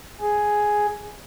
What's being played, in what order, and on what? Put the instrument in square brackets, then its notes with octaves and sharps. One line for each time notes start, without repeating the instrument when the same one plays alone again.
[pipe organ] G#4